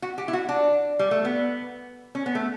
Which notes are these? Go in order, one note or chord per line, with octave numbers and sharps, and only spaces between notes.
F#4
G4
E4
F#4
D4
G3
A3
B3
C#4
B3
A3